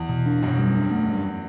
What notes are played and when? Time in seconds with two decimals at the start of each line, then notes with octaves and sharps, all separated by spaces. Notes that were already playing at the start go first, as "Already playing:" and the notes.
Already playing: E2
0.09 B2
0.26 D4
0.42 F#2 B2
0.59 G3
0.75 D4
0.91 A3
1.08 G2